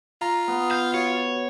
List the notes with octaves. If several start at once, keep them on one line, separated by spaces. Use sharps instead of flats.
F4 A#5
B3
F5 G6
F#4 C#5